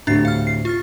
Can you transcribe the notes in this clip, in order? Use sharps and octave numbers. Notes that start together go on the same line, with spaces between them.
D2 A2 C3 D4 A6 C7
F5 F6
C7
F4 F6 A6